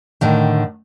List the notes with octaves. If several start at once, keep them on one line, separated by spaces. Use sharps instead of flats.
A2 D3 D#3